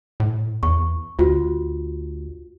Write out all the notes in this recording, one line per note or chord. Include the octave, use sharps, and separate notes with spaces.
A2
E2 C#6
D2 F4 F#4